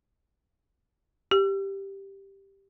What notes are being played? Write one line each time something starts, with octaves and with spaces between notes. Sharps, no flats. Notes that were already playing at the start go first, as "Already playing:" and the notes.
G4